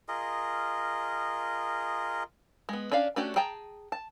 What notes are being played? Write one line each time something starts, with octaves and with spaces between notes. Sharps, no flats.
F4 G#4 A#4 D#5
G#3 B3
C#4 D4 D5 F5
A3 C#4 D4 F#4 G4
G#4 G5 A5 A#5
A5